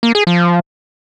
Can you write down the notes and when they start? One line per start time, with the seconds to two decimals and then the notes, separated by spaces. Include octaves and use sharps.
0.03 A#3
0.15 G#4
0.27 F3